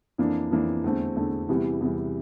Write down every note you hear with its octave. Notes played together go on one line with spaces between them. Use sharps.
F2 E3 A#3 D4
F2 E3 A#3 D4
E2 D3 A3 C4
E2 D3 A3 C4
E2 C3 E3 G3
E2 C3 E3 G3